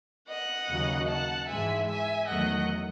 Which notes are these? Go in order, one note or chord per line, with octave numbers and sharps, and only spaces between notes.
D#5 F#5
D#2 C#3 F#3
F#5 A5
G#2 E3 G#3 E5 G#5
E5 G#5
E2 D#3 F#3 A3 D#5 F#5